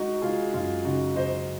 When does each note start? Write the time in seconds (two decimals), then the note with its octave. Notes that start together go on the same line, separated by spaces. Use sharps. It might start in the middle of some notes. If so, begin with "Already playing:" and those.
Already playing: G#3 D#4 F#4
0.22 G#3 F4 G#4
0.54 F#2 F4
0.85 C#3 D#4 F#4
1.16 F#3 C5 D#5